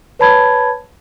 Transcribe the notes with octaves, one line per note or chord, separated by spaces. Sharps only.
B4 C#5 A5 B5 G#6